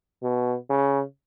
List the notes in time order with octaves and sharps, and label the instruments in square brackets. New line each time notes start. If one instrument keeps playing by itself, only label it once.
[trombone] B2
C#3